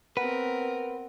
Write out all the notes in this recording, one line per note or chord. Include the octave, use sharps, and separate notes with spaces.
B3 C4 A#4 B4 F#5